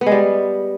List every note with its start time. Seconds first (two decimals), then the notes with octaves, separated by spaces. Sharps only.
0.01 B3
0.06 G#3
0.12 G3